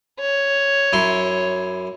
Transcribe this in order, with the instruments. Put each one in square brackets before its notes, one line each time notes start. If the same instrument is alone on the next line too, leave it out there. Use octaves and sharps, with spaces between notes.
[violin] C#5
[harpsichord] F#2 E4 C6